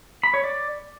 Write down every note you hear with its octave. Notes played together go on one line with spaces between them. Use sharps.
B5
C#5
D5